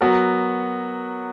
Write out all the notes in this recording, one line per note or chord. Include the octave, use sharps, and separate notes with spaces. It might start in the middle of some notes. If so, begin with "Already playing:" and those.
F#3 B3 F#4 A#4